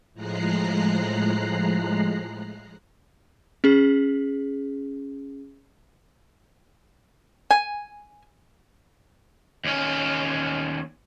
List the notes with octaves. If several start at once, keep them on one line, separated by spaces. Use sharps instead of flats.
A2 F3 G#3 A#5 F#6 C7
C#4 G#4
G#5
D#2 C#4